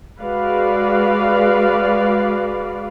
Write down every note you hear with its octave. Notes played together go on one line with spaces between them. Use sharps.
G#3 F#4 B4 D5 F5